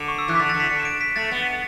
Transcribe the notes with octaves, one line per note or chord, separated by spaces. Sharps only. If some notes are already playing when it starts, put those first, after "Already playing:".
Already playing: D3
C#6
E6
E3 F#6
B6
D3 A6
A6
D3
B6
D3 C#7
E7
D7
B6
A3 A6
B3